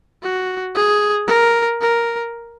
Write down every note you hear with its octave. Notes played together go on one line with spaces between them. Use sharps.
F#4
G#4
A#4
A#4